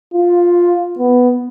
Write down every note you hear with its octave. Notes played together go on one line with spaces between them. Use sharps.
F4
B3